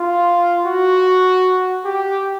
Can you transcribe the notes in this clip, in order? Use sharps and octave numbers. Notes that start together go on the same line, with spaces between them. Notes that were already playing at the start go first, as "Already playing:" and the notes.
Already playing: F4
F#4
G4